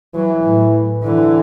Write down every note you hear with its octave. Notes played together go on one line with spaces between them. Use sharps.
E3 F#3
A2
D3 E3